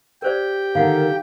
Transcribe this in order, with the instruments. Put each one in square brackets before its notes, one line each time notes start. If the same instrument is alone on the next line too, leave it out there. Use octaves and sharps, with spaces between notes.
[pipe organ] G4 G5 [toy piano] A#4 C5 D5
[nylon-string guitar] D3 D#3 [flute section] A#4 [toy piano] F5 F#5